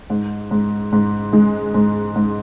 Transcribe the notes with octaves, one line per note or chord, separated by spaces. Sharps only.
G#2
G#2
G#2
G#3
G#2
G#2